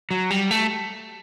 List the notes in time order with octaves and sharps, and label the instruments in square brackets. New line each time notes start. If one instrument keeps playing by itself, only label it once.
[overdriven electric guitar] F#3
G3
A3